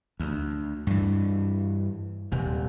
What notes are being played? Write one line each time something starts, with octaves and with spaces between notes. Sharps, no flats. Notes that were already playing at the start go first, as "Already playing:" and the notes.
D2
G2 E3
D#1 C3